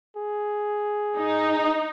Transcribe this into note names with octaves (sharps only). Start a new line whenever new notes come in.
G#4
D#4